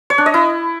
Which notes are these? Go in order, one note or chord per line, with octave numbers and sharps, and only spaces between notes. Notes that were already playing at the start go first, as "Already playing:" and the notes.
C#5
D4
D#5
E4